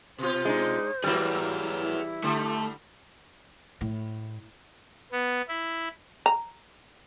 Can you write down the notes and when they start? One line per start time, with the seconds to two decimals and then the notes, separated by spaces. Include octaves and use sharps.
0.18 B2 F4 C5
0.45 G#3 D4 D#4
1.04 G#2 E3 F#3 G3 A#3 G#4 B4
1.80 E4
2.23 D3 G3 A3
3.81 A2
5.12 B3
5.48 E4
6.26 A#5